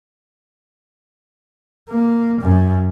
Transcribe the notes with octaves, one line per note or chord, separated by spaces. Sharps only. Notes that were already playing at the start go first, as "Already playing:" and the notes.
A#3
F#2